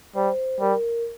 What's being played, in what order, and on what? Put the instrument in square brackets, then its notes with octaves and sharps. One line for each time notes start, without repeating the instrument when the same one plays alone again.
[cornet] G3 [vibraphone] C5
[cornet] G3 [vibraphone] A#4